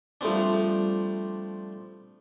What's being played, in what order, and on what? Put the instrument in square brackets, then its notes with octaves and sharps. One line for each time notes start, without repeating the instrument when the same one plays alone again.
[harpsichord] F3 G3 A3 C4 D4